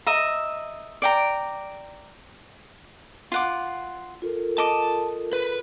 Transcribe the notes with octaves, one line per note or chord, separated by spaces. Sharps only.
D#5 E5 A#5
D5 G5 A#5
F4 F#5 D6
F4 A4 A#4
D#5 A5 D6
B4